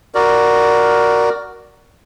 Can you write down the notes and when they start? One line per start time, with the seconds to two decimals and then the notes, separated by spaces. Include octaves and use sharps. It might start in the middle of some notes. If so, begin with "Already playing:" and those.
0.15 F#4 A#4 D5